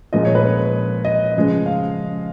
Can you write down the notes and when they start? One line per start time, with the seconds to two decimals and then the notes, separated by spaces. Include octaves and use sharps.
0.13 A#2 F3 G#3 D#5
0.25 C#5
0.35 B4
0.47 C#5
1.05 D#5
1.36 C#3 F3 G#3
1.66 F5